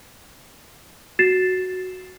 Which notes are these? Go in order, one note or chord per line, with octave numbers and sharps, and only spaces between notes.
F#4 A6 C7 E7